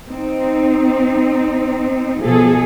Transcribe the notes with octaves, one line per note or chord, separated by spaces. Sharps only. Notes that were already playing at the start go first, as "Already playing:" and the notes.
C4 D#4
B2 F3 G#4 A4